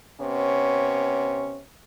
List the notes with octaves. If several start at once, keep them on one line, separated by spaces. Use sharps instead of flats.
C3 B3 C#4 C#5